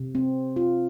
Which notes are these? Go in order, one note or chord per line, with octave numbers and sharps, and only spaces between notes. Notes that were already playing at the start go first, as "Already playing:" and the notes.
Already playing: C3
C4
F4